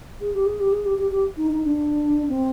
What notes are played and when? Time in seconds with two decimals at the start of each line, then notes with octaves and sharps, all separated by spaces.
0.21 G#4
0.34 G4
0.46 G#4
0.60 G4
0.72 G#4
0.85 G4
0.99 G4
1.11 G4
1.37 D#4
1.51 D#4
1.64 D4
2.29 C4